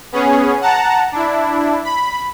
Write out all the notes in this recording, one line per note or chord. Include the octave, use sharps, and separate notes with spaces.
B3 C#4 G#4
F#5 A5 A#5
D4 E4
B5